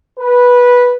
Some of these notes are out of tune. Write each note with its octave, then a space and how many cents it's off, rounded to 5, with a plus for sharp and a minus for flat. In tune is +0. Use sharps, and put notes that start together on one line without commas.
B4 -10